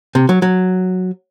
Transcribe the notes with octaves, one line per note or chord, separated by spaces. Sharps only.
C3
F#3
F#3